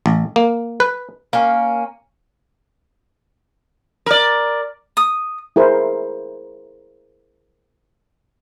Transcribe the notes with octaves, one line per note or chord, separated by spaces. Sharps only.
A1
A#3
B4
A#3 C#4
A#4 D5
D#6
E4 G#4 A#4 C5